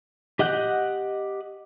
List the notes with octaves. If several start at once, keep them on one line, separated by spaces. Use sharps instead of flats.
G4 D#5 F#5 F#6 G6